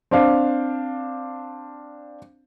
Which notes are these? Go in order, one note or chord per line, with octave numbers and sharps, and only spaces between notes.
C4 D4 F5